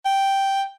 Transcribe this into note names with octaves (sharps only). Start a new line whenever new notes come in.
G5